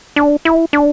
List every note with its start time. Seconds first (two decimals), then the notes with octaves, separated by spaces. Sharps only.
0.16 D4
0.45 E4
0.73 D4